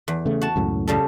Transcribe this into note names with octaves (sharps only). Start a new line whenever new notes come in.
E2
C#3 A3
F#4 A5
C#2 F#2 A2
C#3 G3 A4